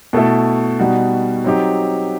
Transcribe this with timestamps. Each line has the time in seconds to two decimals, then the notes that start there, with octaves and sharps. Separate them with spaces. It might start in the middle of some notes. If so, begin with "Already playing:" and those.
0.13 B2 A3 E4 A4
0.79 B2 G3 D#4 F#4
1.44 F#3 C4 D#4 G4